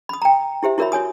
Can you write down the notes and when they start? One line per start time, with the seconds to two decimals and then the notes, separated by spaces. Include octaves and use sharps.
0.09 B5 D#6
0.22 G5 A#5
0.63 E4 G4 C5 E5
0.78 E4 F#4 A#4 C#5 E5 B5
0.92 F#4 C#5 G#5 D#6